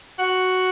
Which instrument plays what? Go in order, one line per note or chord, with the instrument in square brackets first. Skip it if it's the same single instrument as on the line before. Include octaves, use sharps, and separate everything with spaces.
[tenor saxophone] F#4